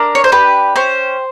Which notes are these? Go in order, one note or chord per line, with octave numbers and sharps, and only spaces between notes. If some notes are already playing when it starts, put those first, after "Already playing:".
Already playing: D4 A#4
C#5
C5
G4 B4
C#4 C5